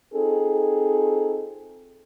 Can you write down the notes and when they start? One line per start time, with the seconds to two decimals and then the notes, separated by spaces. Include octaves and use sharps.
0.14 C4 D#4 F4 G#4 A4